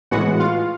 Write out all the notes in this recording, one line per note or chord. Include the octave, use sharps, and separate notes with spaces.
A2 E3 G#3 B3 F#4 F#5
F4 F5